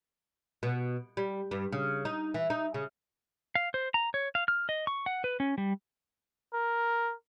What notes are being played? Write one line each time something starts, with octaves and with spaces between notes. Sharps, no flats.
B2
G3
G2
C#3
D#4
E3
D#4
C#3
F5
C5
A#5
C#5
F5
F6
D#5
C#6
F#5
B4
C#4
G3
A#4